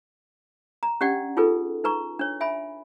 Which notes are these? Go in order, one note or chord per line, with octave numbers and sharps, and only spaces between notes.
A#5
C#4 D4 G4 D5 F#5 G5
D#4 F4 G#4 A4 B4
D#4 B4 A#5 C#6
D4 C#5
E5 G#5 B5